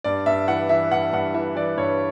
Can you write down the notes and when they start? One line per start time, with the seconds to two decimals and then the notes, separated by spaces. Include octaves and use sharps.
0.04 G2 D5
0.26 G2 E5
0.48 E3 F#5
0.69 E3 E5
0.92 G2 F#5
1.13 G2 F#5
1.34 E3 E5
1.56 E3 D5
1.77 G2 C#5